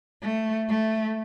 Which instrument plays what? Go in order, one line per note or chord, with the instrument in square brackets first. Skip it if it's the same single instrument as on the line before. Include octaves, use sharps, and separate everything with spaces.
[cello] A3
A3